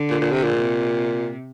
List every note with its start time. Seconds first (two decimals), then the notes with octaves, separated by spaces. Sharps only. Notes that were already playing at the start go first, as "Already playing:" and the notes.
Already playing: D3
0.10 A#2
0.21 A#2
0.32 C3
0.44 A#2
0.55 C3